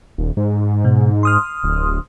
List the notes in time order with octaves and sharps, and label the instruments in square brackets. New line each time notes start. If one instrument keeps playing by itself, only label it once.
[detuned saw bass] D#1
G#2
[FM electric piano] B2
C6 D#6 F6
[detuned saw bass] D1